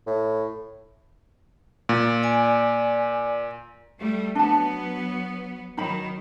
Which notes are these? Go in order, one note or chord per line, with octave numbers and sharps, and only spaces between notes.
A2
A#2
D5 G#5
G3 A3
F#3 B3 D4 A5
D#3 F#3 D#4 B5